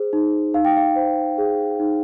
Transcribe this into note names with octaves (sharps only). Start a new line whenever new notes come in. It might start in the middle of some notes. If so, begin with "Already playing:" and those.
Already playing: G#4 C5
D#4
D#4 F5
G5
F5
C5
G#4
D#4